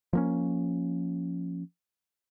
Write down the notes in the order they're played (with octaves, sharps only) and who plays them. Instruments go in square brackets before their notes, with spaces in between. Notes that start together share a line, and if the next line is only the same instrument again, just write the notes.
[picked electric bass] F3 A#3 C#4